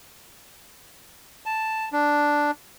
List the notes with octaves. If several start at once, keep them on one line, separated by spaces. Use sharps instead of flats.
A5
D4